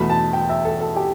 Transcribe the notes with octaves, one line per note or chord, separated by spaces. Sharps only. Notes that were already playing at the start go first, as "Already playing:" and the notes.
Already playing: E2 B2 A3 B5
A5
G5
E5
A4
A4
G4